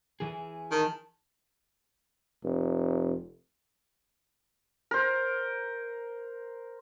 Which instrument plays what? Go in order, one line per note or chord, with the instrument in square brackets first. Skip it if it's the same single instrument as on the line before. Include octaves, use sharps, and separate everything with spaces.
[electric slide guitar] E3 G#4
[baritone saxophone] D#3 [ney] A5
[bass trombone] F1
[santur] A#4 C5